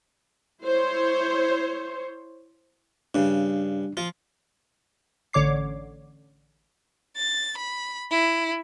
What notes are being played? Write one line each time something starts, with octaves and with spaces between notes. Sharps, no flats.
E4 C5 C#5
G2 C#3 D4
F3 F4
A1 D3 C#5 D6 C7
A6
B5
E4